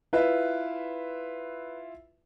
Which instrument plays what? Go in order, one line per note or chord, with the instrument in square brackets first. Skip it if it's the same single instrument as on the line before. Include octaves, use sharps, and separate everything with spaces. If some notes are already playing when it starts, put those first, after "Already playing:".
[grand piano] E4 F4 E5 [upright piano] B4